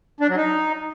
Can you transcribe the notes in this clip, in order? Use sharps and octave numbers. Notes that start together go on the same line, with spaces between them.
D4
F#3
D#4